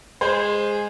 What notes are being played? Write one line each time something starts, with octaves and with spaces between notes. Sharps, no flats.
G#3 C5